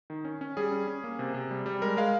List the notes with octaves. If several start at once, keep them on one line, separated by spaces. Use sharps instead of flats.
D#3
C#4
C#4
G3 G#4
C#4
C#4
A#3
C3
C3
G3
G3
G#3 A#4
G#3 F5